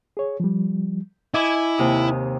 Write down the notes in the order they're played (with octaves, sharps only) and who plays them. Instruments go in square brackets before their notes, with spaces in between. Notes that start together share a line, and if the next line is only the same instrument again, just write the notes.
[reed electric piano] G#4 C#5
F3 G3
[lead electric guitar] E4 [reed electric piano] D#5 [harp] G#5 D6 D#6
[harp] D#2 C3 D#6